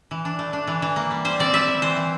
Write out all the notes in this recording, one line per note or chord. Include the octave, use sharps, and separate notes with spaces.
E3
D4
A3
D4
E3
E3
A#3
G3
G3 C5
C4 D5
G3 E5
E4
E3 C5
E3